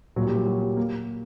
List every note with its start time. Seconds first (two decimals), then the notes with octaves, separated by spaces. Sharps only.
0.16 A#2 F#3
0.27 G3
0.36 F#3
0.46 F#3
0.62 G3
0.77 A#3